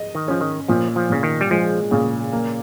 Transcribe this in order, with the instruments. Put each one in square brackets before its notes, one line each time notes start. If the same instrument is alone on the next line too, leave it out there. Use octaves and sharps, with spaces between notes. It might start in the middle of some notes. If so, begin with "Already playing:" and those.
Already playing: [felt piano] D#5
[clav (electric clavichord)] D#3
[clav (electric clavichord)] F3 [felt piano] C#4
[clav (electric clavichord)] D#3
[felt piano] A#2 [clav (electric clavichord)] F3
[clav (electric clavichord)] F3
[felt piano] A#2 [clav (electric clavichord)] C#3
[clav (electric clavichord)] D#3
G3
[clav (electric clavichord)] F3 [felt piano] G#3
[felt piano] A#2 [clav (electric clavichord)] C#3
[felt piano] A#3